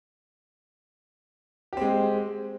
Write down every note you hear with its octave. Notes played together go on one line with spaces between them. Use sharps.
G#3 C4 G4